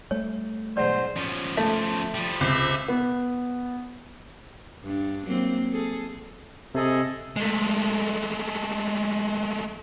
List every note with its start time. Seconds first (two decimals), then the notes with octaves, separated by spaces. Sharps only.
0.11 G3 A3 C#5
0.77 G#2 B2 F#3 C5 D5
1.17 F3 C#4
1.57 A3
2.15 F3 G3
2.41 C#2 C3 C5 E5
2.88 B3
4.84 G2 D4
5.27 F#3 A#3 C4
5.72 G#4 A4
6.75 C3 G#4 A4 D#5
7.36 G#3 A3